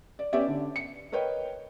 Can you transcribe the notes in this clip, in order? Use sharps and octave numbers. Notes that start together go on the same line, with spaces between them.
D5
B3 C#4 G4 D5 E5
D3
C#7
A#4 B4 C#5 D#5 G5